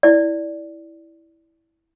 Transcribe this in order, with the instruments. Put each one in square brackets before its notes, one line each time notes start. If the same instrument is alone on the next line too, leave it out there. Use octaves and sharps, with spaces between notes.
[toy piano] E4 D5